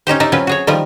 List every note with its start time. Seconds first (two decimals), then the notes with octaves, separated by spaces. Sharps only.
0.07 C#4 D#4 G4 C5
0.20 D#4 A#4 D5 E5
0.32 F#3 C4 C#4 F4 B4
0.47 F#4 G#4 C#5
0.67 D#3 F3 G3 F4 A#4